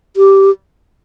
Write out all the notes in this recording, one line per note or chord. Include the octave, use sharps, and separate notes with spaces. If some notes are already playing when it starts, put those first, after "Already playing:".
G4